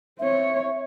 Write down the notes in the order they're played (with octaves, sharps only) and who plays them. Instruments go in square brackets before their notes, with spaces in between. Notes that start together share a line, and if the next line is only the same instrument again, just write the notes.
[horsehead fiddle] C4 C#5 [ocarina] E5